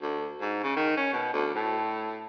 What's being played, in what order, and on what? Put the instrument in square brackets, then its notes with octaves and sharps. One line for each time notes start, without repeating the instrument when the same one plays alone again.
[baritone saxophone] D2
G#2
C#3
D#3
C#4
B2
D2
A2